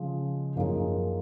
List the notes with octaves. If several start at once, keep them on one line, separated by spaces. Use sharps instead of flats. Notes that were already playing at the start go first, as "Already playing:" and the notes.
Already playing: C#3 F3 G#3
F#2 F3 A#3 D#4 G#4